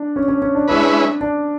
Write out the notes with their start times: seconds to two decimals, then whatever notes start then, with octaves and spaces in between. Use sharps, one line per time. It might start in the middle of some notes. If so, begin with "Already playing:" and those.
Already playing: D4
0.16 C#4
0.28 C#4
0.42 C#4
0.55 D4
0.68 G#3 C#4 D4 E4 B4
1.21 D4